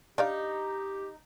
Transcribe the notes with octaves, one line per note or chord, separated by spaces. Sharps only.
D4 D#4 G4 D5 F5